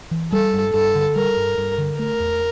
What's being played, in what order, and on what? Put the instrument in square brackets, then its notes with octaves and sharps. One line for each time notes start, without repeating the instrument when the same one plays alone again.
[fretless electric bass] E3
[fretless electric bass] G3 [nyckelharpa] A4
[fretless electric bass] G2
[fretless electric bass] G2 [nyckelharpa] A4
[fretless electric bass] D3
[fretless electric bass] G3 [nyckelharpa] A#4
[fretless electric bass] G2
G2
D3
[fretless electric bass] A3 [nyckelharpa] A#4
[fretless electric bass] E2